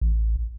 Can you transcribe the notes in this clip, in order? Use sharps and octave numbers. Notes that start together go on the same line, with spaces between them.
A1